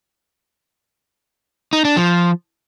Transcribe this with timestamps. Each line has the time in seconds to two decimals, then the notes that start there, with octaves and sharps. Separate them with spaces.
1.73 D#4
1.85 D4
1.97 F3